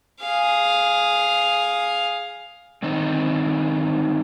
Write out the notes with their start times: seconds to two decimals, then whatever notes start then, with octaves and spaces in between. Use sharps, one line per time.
0.21 G#4 F5
2.83 G2 D3 D#3 C4 D#4